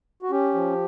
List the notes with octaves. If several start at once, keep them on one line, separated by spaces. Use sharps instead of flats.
F#4
C#4 G4
F3